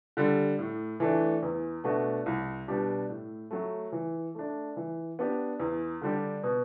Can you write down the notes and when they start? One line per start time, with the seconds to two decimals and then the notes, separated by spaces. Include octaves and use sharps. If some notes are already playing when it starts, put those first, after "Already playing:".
0.17 D3 G3
0.59 A2
1.00 E3 A3 D4
1.42 E2
1.84 B2 A3 D4 F#4
2.26 C2
2.68 B2 G3 D4 G4
3.09 A2
3.51 F#3 A3
3.92 E3
4.35 A3 D4
4.76 E3
5.19 B3 D4 G4
5.60 E2
6.02 D3 G3 D4 G4
6.43 B2